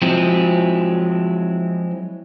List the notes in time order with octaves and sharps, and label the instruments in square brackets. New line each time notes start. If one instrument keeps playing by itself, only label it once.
[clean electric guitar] F3 F#3 G#3 C4 E4